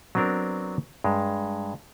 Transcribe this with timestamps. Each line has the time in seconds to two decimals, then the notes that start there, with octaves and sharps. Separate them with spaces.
0.15 F#3 B3 C4 D4 A#4
1.04 G2 G#3